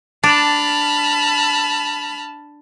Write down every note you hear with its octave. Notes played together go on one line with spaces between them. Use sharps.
D4 A5 B5 F6